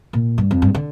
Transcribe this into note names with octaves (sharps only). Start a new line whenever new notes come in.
A#2
G2
F2
G2
D3